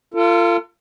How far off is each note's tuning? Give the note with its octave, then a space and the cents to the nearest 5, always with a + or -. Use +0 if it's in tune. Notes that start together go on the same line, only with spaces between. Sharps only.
F4 -25 A4 +40